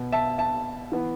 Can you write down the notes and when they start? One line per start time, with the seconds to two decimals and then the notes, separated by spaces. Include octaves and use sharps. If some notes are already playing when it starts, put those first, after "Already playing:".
Already playing: B2 B3
0.12 E5 A5
0.38 E5 A5
0.92 E3 B3